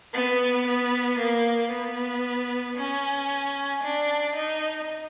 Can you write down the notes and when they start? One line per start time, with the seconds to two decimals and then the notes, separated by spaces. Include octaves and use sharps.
0.14 B3
0.67 B3
1.19 A#3
1.72 B3
2.77 C#4
3.83 D4
4.36 D#4